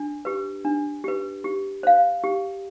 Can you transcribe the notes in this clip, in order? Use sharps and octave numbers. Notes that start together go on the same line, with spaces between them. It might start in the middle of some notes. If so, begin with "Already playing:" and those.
Already playing: D4
G4 B4
D4
G4 B4
G4
C5 F5
G4